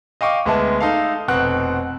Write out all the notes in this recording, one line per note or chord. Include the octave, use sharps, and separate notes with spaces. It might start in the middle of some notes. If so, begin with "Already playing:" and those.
D#5 F5 G5 C#6 D6
D2 G#3 B3 E5 A5
D#4 A4 F5
F1 B2 C4 F#5 F#6